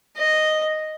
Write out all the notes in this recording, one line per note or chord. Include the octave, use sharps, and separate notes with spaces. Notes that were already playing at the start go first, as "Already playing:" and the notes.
D#5